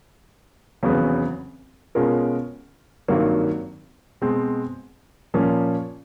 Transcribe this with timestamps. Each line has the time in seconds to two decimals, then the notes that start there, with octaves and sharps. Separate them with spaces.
0.83 F1 E2 C#3 F#3 B3
1.95 B2 G#3 C#4 F4 A#4
3.08 G#1 G2 D#3 F#3 A#3
4.21 B2 G#3 C4
5.34 A#2 F3 A#3 C#4